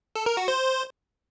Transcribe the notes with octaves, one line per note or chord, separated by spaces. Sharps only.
A4
A#4
F#4
C5